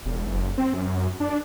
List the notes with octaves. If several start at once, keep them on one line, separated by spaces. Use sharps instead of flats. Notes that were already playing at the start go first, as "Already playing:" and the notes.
E1
F#1
C4
F#2
D4